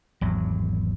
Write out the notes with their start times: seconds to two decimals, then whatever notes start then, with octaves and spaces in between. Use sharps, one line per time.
0.21 G#1 E2 F#3